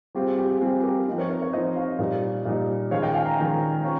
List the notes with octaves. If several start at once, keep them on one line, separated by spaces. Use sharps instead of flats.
G3 C4 F4 G4
G#4
G4
G#4
G3 C4 F4 G#4
G4 A#4
F3 C4 D#4
A#4 C#5
A#4 C#5
A#4 C#5
F3 C4 D#4 C5 D#5
C#5 F5
A#2 G3 A#3 D#4
A#2 G3 A#3 D#4
D#3 G#3 C#4 F4 C#5 F5
D#5 G5
F5 G#5
G5 A#5
D#3 G#3 C#4 F4
C#4 F4